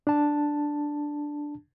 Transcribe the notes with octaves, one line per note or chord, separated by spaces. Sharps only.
D4 A5